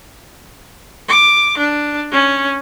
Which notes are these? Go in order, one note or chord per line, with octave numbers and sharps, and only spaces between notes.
D6
D4
C#4